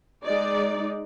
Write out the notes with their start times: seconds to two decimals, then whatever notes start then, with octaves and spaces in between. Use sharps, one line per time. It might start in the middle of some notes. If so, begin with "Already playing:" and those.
0.24 G#3 D#4 D5